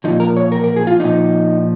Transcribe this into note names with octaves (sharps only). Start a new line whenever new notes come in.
A#2 F3 D#4
A#4
C#5
A#4
A#4
G#4
F4
A#2 F3 D#4